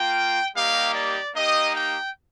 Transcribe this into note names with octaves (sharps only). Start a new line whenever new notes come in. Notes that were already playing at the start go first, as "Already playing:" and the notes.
Already playing: A#3 F4 G5
G3 A#3 D#4 G4 F5
D5
A#3 D#4 G4 D#5
G5